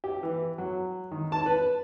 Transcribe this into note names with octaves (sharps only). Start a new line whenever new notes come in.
G4
E3
F#3
D#3
A5
B4